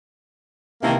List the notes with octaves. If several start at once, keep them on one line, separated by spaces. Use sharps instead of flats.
C3 D#3 E3 A#3 A5 A#5